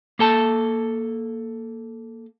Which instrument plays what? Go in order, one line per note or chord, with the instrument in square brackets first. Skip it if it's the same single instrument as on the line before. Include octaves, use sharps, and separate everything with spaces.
[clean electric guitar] A#3 A4 A5